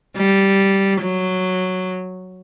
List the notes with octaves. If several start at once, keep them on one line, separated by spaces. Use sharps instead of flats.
G3
F#3